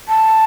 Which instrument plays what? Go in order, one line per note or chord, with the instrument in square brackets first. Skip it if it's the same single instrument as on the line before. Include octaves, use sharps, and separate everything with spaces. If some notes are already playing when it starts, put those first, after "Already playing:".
[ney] A5